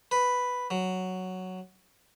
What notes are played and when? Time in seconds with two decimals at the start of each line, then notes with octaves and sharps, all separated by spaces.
0.11 B4
0.70 F#3